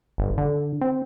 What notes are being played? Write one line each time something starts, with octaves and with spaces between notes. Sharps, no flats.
G1
D3
C4